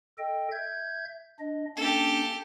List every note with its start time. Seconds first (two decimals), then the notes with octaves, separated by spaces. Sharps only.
0.18 A4 D#5 G5
0.51 E5 G6 G#6
1.39 D4 D#5
1.77 A#3 C#4 D4 G4 A4